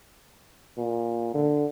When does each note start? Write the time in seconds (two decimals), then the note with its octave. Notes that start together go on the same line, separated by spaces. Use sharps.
0.77 A#2
1.34 D3